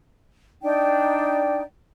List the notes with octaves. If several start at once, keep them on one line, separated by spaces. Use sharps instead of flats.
D4 D#4 D5 G5